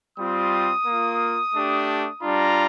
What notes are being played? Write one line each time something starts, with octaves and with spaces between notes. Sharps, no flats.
G3 C4 F4 D#6
A#3 F4
A3 D4 G4
G3 D4 F4 A#5